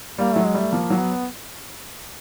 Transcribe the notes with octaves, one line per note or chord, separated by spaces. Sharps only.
G3 A#3
F#3 A3
G#3
G3 A3
F3 A#3
F#3
B3